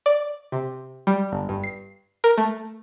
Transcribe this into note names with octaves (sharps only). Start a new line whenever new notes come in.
D5
C3
G3
G1
G2
C7
A#4
A3